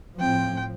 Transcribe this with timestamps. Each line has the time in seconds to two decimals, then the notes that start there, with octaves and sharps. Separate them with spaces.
0.20 A2 F3 C4 G5